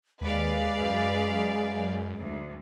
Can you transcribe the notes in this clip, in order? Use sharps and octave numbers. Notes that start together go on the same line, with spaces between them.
D#2 G#3 B4 D5 F5
F#2
D2